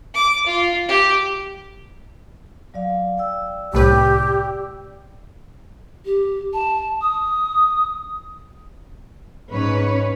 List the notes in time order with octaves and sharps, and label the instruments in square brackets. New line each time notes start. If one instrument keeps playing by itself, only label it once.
[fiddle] D6
F4
G4
[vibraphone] F#3 D5 F5
D5 G5 E6
[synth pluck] C2 A2 B4 [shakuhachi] G4
[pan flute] G4
A5
D#6
[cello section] G#2 C#4 B4 C#5